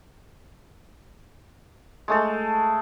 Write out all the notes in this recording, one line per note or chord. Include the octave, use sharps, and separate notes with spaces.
G#3 A3 A4